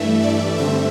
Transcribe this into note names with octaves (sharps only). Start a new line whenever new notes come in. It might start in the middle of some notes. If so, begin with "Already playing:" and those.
Already playing: G2 E3 A3 E5
D5
G2 D3 A3 C4 E5